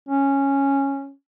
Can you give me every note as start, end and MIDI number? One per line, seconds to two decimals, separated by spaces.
0.09 1.12 61